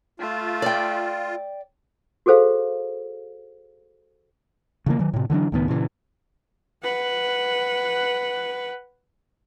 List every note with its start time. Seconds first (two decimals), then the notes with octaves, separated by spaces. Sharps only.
0.20 A3 F4
0.62 D5 G5
2.26 F#4 G#4 A4 C5 F5
4.86 C#3 E3 A#3
4.99 D#3 F#3
5.13 A2 C3
5.30 D3 E3 F#3 D4
5.52 C#2 A2 D#3 B3
5.68 A#2 C#3 E3
6.83 B4 F#5